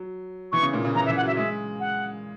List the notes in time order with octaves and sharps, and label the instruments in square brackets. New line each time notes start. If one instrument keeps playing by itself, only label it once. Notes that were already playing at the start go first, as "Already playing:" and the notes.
Already playing: [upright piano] F#3
[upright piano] E3 [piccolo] C#6
[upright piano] C#3
A#2
C#3
[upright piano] E3 [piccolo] A#5
[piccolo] E5
[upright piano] E3
[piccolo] F#5
[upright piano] F#3 [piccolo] E5
[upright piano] G#3 [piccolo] E5
[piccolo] F#5